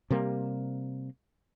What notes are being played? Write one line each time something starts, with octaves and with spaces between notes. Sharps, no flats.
C3 G3 A#3